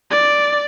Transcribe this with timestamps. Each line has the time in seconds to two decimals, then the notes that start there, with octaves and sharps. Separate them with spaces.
0.11 D5